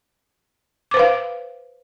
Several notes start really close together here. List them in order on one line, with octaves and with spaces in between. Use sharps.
D6 C5 B4 F5